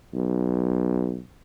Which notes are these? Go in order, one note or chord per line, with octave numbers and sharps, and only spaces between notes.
B1